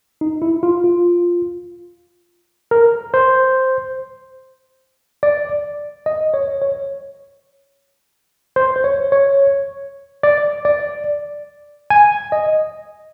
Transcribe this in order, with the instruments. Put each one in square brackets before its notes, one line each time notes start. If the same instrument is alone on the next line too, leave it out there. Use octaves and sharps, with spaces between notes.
[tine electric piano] D#4
E4
F4
F4
A#4
C5
D5
D#5
C#5
C#5
C5
C5
C#5
C#5
D5
D5
G#5
D#5